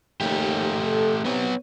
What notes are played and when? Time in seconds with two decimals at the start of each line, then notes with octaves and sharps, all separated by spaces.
0.21 D#2 A3 G4
0.84 A4
1.25 C3 B3 B4 C#5